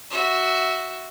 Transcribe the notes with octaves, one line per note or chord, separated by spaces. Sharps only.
F#4 E5